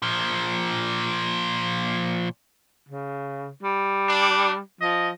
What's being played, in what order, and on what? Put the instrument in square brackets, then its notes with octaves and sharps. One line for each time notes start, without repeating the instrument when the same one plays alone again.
[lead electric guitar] A#2 F3
[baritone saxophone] C#3
G3
[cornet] D4
[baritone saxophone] F3 [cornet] D#5